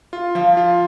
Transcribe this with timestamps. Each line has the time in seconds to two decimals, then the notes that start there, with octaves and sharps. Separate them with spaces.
0.13 F4
0.35 F3 F5
0.57 F4